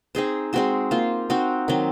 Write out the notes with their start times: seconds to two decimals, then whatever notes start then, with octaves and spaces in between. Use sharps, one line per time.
0.15 C4 D#4 G#4 C5
0.53 G#3 C4 F#4 C5
0.91 A#3 F4 C5
1.30 C4 D#4 F#4
1.68 D#3 F#3 C4